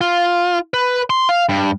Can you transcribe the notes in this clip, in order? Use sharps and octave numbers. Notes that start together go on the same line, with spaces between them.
F4
B4
C6
F5
G2